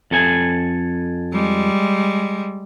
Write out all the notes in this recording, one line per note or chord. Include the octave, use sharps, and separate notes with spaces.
F2 A4 G#5
G3 G#3